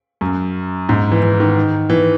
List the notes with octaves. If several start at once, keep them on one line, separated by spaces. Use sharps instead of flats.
F#2
G#2
E3
E3
D#3
E3